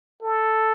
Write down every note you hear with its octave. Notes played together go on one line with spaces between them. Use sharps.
A4